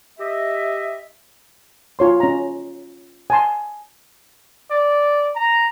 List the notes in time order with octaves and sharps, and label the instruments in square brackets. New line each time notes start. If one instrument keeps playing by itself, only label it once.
[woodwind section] G4 D#5 E5
[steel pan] F4 C#5 C6
C#4 A#5
G#5 A5 C6
[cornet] D5
A#5